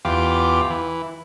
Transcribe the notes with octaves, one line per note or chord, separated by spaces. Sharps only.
E2 F4 G4 D6
E3